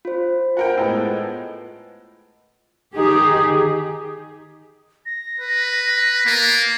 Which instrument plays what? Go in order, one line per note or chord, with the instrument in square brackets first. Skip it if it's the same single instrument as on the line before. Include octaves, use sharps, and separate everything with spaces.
[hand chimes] F4 C5
[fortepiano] F#4 A#4 G5
A2 G#3 B3
[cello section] D#3 G4 G#4 [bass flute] D#4
[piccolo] A#6
[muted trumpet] B4
[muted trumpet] A#3 [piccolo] A6